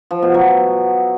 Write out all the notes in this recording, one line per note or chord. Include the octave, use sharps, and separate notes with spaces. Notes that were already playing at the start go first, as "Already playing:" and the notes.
F3
B2
F#3